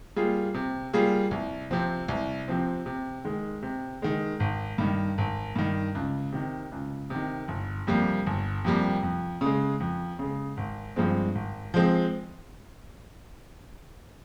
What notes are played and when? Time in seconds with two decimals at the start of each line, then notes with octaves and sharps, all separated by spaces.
0.16 G3 A#3 F4 G#4
0.54 C3
0.93 G3 A#3 F4 G#4
1.31 C2
1.71 C3 F3 C4
2.08 C2
2.48 C3 F3 C4
2.86 C3
3.25 D#3 G#3
3.63 C3
4.02 D#3 G#3
4.40 G#1
4.78 G2 D#3
5.18 G#1
5.56 G2 D#3
5.95 C#2
6.32 C3 D#3
6.72 C#2
7.10 C3 D#3
7.48 G1
7.87 F2 C3 G3 A#3
8.26 G1
8.65 F2 C3 G3 A#3
9.03 F2
9.41 C#3 G#3
9.80 F2
10.19 C#3 G#3
10.57 G#1
10.96 G2 F3 G#3 C4
11.35 G#1
11.74 F3 G#3 C4